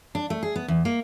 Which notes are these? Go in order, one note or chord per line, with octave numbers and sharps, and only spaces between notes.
D4
A3
G#4
B3
E2
A#3